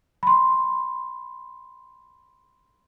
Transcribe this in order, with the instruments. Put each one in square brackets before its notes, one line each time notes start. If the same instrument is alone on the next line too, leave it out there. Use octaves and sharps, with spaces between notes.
[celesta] B5 C6